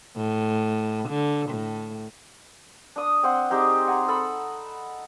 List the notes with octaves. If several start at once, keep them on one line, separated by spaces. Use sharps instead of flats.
A2
D3
A2
D4 D#6
C4 C5 F#5
C4 D#4 G4 G#4
F#5 G#5 A#5
A4 B5